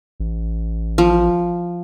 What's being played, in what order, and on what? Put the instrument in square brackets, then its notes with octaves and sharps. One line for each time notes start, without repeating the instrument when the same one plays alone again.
[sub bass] A1
[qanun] F3